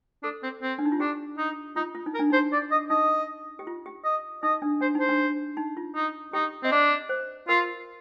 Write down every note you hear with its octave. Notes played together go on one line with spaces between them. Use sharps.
D4 A4
C4
C4
D4
D#4
F4
D4 G4
D#4
D#4 F4
F4
D#4
A#4
D4
D#4 C5
D5
D#5
D#4 D#5
G4
F4
G4
D#5
D#4 D#5
D4
D4 C5
D#4
C5
D4
D#4
F4
D#4
D#4 G4
C4 D#5
D4 D5
C5
F4 A#4